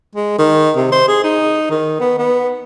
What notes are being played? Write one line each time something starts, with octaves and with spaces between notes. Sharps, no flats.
G#3
D#3
C3
C5
G#4
D#4
D#3
B3
B3